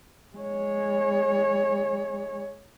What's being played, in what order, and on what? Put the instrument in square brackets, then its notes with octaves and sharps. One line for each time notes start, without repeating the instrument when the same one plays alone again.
[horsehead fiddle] G#3 C#5